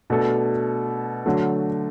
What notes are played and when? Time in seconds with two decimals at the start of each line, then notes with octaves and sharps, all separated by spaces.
0.10 B2 A3 D4 A4
1.26 D3 F#3 A3